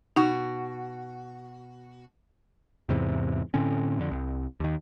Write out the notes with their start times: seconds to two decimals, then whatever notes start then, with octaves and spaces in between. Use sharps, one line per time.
0.16 B2 D#4 F#4
2.89 E2 G#2 C3 E3
3.54 A2 D3 C4 C#4
3.99 F2 D3
4.11 C2
4.60 D#2 D#3